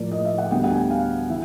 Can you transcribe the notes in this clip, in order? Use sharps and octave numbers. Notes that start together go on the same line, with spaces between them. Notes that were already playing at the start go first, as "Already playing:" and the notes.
Already playing: A2 F3 A#3 D5
D#5
E5
F#5
D2 D3 G3 B3 G5
F#5
G#5
G5
F5
E3 E5